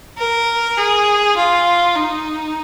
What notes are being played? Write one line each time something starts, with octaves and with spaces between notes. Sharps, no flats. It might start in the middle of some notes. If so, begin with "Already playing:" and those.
A#4
G#4
F4
D#4